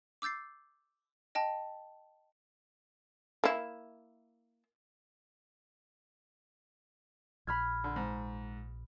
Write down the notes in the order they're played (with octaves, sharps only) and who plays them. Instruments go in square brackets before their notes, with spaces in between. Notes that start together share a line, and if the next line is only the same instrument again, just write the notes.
[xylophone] D6 E6 G6 A6 C7
D#5 G5 A5
[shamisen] A#3 E4
[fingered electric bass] A#1 [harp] B5 F6 G#6
[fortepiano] D3
G#2